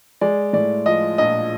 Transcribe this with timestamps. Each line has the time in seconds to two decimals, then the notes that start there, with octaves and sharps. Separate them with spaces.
0.21 G#3 D5
0.53 A2 D5
0.86 F3 D#5
1.18 A#1 D#5